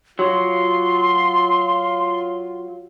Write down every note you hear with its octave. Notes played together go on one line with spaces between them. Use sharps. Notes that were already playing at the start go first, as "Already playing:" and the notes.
F#3 F4 C6